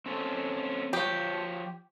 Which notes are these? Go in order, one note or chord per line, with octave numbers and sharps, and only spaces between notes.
C4 C#4 A4
F3 G4 C#5